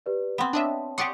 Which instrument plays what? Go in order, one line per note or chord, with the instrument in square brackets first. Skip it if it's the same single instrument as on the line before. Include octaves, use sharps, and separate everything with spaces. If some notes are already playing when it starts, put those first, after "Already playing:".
[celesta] G4 B4 D5
[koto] B3 C4
[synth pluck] D4 D#5 E5 [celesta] C#5 A5
[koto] G4 D5 F#5 [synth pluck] C6 C#6 D#6